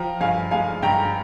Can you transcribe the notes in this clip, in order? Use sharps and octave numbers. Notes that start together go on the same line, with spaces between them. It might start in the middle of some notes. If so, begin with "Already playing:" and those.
Already playing: F3 G5 A#5
G2 F5 G#5
G#3 F5 G#5
G2 G5 A#5